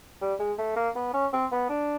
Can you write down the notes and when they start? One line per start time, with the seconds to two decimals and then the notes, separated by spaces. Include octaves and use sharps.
0.21 G3
0.40 G#3
0.58 A3
0.76 A#3
0.95 B3
1.14 C#4
1.33 C4
1.52 B3
1.69 D4